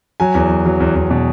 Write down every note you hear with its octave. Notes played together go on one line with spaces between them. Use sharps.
F#3 G#5
E2
F#3
F#3
E2
E2
B2